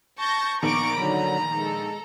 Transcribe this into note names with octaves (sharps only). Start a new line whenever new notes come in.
A5 C#6 G6 A#6
A#1 D#3 B3 A#5 C#6 D6 D7
D3 F#3 B5
G#3 A4